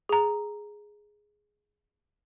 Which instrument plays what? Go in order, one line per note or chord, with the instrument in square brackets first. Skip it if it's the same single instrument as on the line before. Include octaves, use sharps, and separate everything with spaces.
[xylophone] G#4 A#5